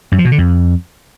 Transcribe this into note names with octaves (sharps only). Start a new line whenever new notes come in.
F#2
F3
B2
D3
F2